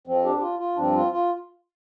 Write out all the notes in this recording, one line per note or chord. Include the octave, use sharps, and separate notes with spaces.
F2 F3 C4
D4 G4
G4
F4
F4
G2 F3 C4 D4
F4
F4